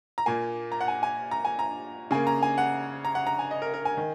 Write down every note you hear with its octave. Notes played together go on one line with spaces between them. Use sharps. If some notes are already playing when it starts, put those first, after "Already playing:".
A#5
A#2 A#3 G#5
A#5
F#5
G#5
G#5
A#5
G#5
A#5
C#3 A#3 G#5
A#5
G#5
F#5
A#5
F#5
A#5
G#5
D#5
A#4
A#4
G#5
D#3